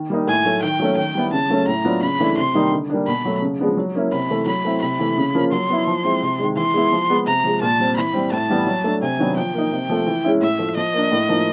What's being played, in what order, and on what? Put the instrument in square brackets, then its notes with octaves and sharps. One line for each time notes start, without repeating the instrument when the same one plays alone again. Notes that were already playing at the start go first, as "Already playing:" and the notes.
Already playing: [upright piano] D#3
G3 A#3 D#4
[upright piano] A2 [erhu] G#5
[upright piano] F#3 A3
[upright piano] D#3 [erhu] G5
[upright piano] F#3 A3 C#4
[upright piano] D#3 [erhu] G5
[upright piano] G3 B3 E4
[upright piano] C#3 [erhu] A5
[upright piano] F#3 A3 C#4
[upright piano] A2 [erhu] A#5
[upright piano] F#3 B3 D4 F4
[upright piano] C#3 [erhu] B5
[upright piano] E3 A3 D4
[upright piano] C3 [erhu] C6
[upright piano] D#3 G3 A#3 D#4
D3
G3 A#3 D4
[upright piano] B2 [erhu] B5
[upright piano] F#3 A3
C#3
F3 G#3 B3 D4
F#3
A#3 C#4 E4
[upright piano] C3 [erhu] B5
[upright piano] E3 A3
[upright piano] F#3 [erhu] B5
[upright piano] A3 C4 E4
[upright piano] C3 [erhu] B5
[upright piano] E3 A3
C#3
F3 A#3 C#4 F4
[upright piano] F#3 [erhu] C6
[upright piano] B3 E4
F3
G#3 C4 E4
C3
D#3 G#3
[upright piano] E3 [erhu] C6
[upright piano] G#3 B3 E4
F3
G#3 B3
[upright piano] C3 [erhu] A#5
[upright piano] F3 G#3
[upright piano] A#2 [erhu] A5
[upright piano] G3 C4
[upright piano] E3 [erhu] B5
[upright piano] G3 C4
[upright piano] A2 [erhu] A5
[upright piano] E3 G3 B3
F#3
A3 D4
[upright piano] C3 [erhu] G#5
[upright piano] D#3 F#3 B3 D4
[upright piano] F3 [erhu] G5
[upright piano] A#3 D#4
C3
F3 A3
E3
G#3 C#4 E4
[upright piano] A2 [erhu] E5
[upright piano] F3 A3
[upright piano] F3 [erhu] D#5
[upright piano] A#3 D4
A2
F3 A#3 D#4